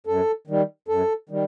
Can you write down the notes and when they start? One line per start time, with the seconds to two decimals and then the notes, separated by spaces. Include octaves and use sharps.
0.07 F#2 A4
0.47 D#3 G3
0.88 F#2 A4
1.29 D#3 G3